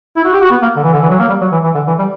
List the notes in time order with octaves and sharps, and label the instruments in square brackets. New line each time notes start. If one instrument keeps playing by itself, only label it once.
[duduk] E4
F#4
G4
F#4
B3
A#3
D3
E3
D3
E3
F#3
A#3
G3
F#3
E3
E3
D3
E3
G3